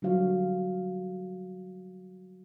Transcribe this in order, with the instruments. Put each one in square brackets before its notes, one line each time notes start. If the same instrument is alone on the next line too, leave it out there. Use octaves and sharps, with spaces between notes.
[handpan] D3 F#3 G3 F#4 F5